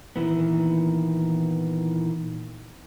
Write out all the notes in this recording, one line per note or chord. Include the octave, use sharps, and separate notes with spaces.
A#2 D#3 E3 B3